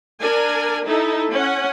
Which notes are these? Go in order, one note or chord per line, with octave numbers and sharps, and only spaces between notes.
D4 A#4 G#5
D#4 E4 A4
C#4 F#5